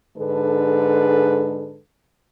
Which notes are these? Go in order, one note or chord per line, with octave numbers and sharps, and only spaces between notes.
G#2 D3 G#3 D4 A4 B4